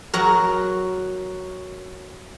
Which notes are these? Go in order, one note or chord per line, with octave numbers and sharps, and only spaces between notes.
F#3 F#4 A#4